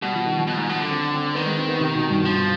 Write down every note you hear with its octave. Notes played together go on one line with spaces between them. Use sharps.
B2 G3
F3
D#3
F3
B2
G#2
B2
D3
C4
C4
D#3 B3
G#3
C4
B3
C3
B2
G2
F3